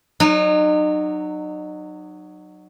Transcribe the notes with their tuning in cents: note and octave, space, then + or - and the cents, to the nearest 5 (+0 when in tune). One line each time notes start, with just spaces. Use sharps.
F#3 +0 D#4 -35